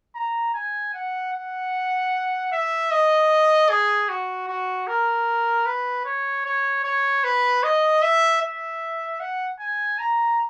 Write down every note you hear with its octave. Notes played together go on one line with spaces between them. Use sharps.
A#5
G#5
F#5
F#5
E5
D#5
G#4
F#4
F#4
A#4
B4
C#5
C#5
C#5
B4
D#5
E5
E5
F#5
G#5
A#5